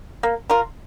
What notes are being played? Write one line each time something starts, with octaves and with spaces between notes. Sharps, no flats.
A#3
F4 A#4